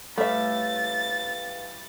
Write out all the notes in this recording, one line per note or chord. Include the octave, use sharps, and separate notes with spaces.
A2 G3 A3 B4 E5 F5 A6